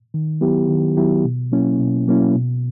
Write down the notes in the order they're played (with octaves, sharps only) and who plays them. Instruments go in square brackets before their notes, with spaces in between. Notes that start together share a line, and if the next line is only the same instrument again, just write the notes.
[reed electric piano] D#3
F#3 B3 E4 G4
D#3
F#3 B3 E4 G4
B2
F#3 A#3 C#4 E4
B2
F#3 A#3 C#4 E4
B2